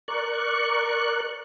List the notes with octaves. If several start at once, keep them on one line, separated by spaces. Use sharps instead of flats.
A#4 D5 C#6 F#6